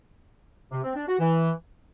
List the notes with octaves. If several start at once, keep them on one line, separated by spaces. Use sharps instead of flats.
C3
C4
D4
F#4
E3